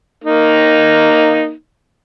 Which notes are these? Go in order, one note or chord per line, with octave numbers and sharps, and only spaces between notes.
A#3 D#4